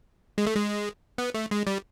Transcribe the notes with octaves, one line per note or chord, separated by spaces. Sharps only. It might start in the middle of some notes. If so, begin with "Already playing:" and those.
G#3
A3
G#3
B3
A3
G#3
G3